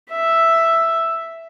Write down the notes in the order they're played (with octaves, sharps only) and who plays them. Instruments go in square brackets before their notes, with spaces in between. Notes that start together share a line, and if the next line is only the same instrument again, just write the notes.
[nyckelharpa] E5